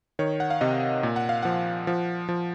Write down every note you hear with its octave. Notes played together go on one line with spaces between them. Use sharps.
D#3 C#5
F#5
F5
C3 D#5
A#2
F#5
F5
F3 F#5
F3
F3